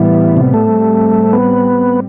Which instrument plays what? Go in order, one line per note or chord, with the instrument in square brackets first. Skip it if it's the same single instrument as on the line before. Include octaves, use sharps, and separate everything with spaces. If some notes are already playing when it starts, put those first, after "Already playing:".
Already playing: [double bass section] A2 G3 B3 [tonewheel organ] E3
[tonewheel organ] C3
A3
[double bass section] A2 G3 C4
[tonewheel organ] B3